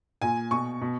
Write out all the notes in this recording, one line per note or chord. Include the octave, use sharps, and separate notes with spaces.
A#2 G#5
B2 C#6
B2